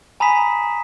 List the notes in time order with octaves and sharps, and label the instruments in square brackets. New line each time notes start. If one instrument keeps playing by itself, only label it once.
[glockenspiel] G#5 A#5 B5 D#6 B6 E7